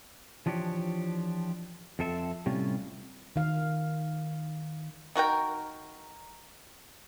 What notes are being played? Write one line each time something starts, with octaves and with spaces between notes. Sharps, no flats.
E3 F3 D4 G4 C#5
F2 C4 A4 E5 G#5 A5
A2 C3 G3 C#4 F4
D#3 F5
D#3 F#4 A#4 G5